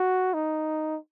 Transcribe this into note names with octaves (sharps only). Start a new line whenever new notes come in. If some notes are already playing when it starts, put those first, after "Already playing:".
Already playing: F#4
D#4